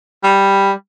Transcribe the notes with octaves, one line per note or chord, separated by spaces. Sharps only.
G3